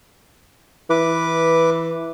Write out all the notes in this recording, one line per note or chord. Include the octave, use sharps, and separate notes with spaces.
E3 B4 D6